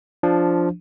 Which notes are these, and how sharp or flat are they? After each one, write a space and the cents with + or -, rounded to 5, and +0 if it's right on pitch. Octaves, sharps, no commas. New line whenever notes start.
F3 +0 D4 +0